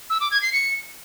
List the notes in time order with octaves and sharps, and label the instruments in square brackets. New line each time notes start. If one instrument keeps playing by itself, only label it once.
[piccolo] E6
D6
G#6
C7
C#7